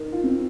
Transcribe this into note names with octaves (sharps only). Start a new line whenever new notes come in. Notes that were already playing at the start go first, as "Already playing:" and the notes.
Already playing: D#4 A#4
F4
C4